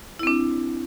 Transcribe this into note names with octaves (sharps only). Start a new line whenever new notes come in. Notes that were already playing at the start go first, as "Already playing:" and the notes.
C4 D4 E4